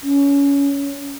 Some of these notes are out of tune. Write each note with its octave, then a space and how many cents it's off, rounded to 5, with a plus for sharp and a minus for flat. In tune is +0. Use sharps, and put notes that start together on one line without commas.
C#4 +20